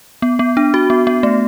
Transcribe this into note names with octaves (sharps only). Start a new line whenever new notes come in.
B3
B3
D4
F#4
B3
B3
A3